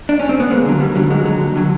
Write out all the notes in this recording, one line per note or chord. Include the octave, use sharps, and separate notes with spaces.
D4
C#4
C4
B3
D#2 G#3 A#3
D3 F#3
D#2 G3
D3 F#3 G3
D#2 F#3 G#3
D3 F#3
D#2
D3 F#3